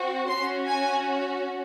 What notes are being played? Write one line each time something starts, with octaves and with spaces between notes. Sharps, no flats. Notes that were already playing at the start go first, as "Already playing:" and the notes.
Already playing: C4 F#4
C#4 F#4 C6
G#5